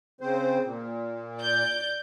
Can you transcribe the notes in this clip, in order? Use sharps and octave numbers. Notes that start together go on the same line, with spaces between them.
C#3 C4 C5
A#2
D5 G6